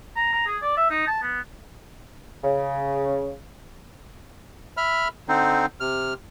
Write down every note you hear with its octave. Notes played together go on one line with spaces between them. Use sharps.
A#5
A#5
G#4
D5
E5
D#4
A5
B3
C#3
E5 B5 F6
D3 C4 D#4
C3 F6